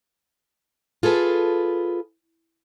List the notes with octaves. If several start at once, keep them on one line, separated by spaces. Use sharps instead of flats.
F4 G#4 A4 B4